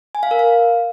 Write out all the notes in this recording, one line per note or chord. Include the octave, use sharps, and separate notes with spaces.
G#5
F5
A#4
F5